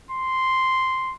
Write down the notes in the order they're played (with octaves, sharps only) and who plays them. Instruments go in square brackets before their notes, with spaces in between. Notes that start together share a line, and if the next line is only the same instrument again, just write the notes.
[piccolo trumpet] C6